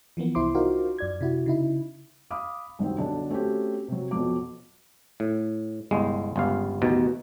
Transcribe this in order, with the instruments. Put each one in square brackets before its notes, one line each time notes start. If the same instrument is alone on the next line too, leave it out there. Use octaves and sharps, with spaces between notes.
[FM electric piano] E3 F3 A#3 B3
C2 E4 C5 C6 D6
D#4 F4 F#4 A#4 C5 F5
F#2 D5 G#6
C3 E4 F#4
C#3 D#4 E4
[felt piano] F5 B5 D6 D#6
C2 F#2 D#3 C4
B1 D3 D4
A3 C4 C#4 F#4 G4
C3 F#3
F2 B2 F#3 D6
[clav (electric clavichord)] A2
G1 C2 G#3
G1 C#2 G2 F5
A1 D#2 B2